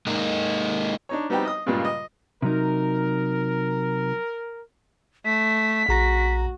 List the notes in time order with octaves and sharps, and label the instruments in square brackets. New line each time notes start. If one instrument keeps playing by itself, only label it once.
[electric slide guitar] G#3 A#3 D#4
[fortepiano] D4 D#4 C#5
G3 B3 C4 D#4 F#4 G4
D#5 D#6
G2 A#2 C#3 G3 G#3 F4
D#5
[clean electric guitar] C3 F#3 D#4 [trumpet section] A#4
[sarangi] A3 [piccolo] B6
[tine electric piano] A#1 A#5 A#6 [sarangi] F#4